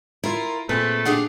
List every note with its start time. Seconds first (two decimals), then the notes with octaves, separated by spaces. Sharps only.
0.24 E4 F4 A#4
0.69 A#2 A3 C4 G#4 B4
1.05 D4 G4 G#4 F5 F#5